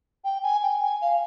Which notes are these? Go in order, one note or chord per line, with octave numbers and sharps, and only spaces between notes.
G5
G#5
G5
G#5
F5